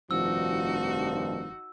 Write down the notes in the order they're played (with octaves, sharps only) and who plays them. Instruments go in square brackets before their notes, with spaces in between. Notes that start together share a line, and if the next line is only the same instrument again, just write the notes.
[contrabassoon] F1 [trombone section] G2 D#3 F3 [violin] D#4 F#4 [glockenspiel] E6